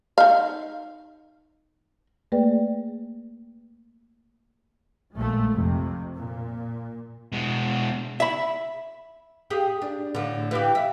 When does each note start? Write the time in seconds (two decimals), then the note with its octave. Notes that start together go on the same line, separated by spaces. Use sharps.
0.18 D#4 F5
2.32 A3 A#3 G#4 B4 D5 G5
5.17 A#1 G#3 A3
5.53 F2 C3
6.16 A#2
7.32 B2 G#3
8.20 E5 B5
9.50 G4 G#4
9.82 D4
10.15 A2 D3
10.51 E3 G4
10.75 E5